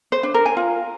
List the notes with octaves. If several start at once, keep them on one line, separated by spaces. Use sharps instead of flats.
C5
D4
A#4
G#5
F4